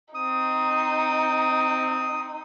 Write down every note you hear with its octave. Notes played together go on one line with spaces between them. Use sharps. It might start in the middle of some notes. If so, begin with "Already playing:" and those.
C4 D#4 D#6